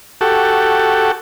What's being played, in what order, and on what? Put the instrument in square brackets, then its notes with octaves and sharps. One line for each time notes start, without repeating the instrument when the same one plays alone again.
[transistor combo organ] F#4 G4 A4